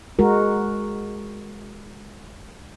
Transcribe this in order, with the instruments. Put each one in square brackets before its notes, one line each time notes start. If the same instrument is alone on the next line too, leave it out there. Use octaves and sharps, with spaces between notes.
[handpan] G#3 F#4 A#4